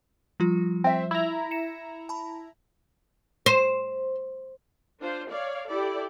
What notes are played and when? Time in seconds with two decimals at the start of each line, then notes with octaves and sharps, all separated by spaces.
0.40 F3 G3 F4
0.84 C4 E5
1.11 E4 A#5
1.51 C#7 E7
2.09 A5 B5
3.46 C5
5.00 D4 F4 C5
5.30 C#5 D5 F5
5.68 E4 G4 A4 D5